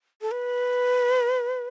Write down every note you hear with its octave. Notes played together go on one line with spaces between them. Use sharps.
A4
B4